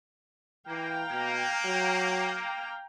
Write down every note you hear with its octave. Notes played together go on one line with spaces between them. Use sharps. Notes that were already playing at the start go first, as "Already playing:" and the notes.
E3 A#3 F5 G5 A#5
B2 A#3
F#3